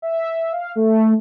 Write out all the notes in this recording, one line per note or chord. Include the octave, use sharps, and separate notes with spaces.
E5
F5
A3